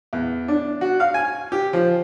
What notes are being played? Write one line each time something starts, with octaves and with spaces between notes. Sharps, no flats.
E2
D4
F#4
F5
G#5
G4
F3